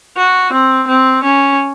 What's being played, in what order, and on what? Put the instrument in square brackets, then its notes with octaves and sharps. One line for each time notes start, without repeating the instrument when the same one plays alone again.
[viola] F#4
C4
C4
C#4